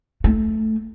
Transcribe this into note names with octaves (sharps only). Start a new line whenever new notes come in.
A3